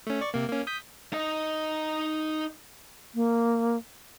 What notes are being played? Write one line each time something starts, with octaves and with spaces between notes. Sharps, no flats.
A3 C#4
D5 C#6
C3 A#3
A#3 C#4
D#6 G6 B6
D#4 D#5
A#3